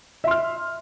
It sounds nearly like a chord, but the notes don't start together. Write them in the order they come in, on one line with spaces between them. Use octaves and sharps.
E5 C6 F6